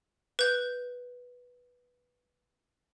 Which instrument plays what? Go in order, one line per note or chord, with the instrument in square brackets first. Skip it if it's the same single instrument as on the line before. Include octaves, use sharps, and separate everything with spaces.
[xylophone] B4 G6